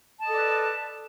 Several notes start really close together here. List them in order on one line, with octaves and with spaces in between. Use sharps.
A5 D#5 A4 D5 B4